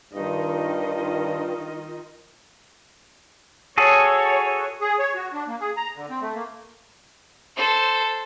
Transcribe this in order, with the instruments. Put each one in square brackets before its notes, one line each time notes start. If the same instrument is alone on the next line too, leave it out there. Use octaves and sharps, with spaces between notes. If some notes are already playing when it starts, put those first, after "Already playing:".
[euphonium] G2 [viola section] D#3 F4 D#5
[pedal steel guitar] F#4 G#4 A4 [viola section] C#5
[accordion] G#4
C#5
F#4
D4
A#3
G#4
A#5
D3
C4
A3
A#3
[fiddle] A4 C5